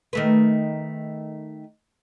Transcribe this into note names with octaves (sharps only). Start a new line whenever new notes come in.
D#3 A3 B4